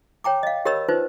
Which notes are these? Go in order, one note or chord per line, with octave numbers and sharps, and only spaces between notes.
C#5 G5 A#5 D6
D#5 F5
G4 A#4 C#5 D#5 B5 E6
D#4 F4 B4 C5